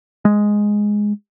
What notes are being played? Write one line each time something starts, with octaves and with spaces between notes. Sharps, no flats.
G#3